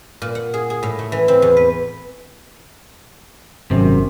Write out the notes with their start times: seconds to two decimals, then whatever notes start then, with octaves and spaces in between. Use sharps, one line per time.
0.22 A#2
0.35 F#5
0.54 G#4
0.70 G#4
0.83 A2
0.99 A3
1.12 E3
1.28 C4
1.42 E2
1.57 B4
3.71 G#1 F#2 C3